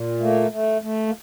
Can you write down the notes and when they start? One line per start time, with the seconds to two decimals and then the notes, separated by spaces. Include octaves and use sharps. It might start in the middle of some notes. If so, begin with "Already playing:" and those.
Already playing: A#2
0.19 A3 A#3
0.51 A3
0.82 A3
1.07 A#3